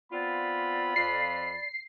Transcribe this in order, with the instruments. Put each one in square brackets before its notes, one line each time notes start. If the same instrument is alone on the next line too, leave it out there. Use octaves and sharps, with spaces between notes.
[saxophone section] B3 C4 F4 [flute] D5 [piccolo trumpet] B5
[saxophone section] F2 F4 [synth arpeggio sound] C7